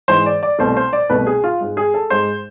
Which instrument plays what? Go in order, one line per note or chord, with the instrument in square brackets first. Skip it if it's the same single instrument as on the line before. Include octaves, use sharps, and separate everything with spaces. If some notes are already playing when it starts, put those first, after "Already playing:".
[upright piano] G#2 E3 G#3 C5
D5
D5
C2 B2 A3 C5
C5
D5
C2 B2 A3 B4
G#4
F4
G#2 G#3
G#4
A4
G#2 G#3 C5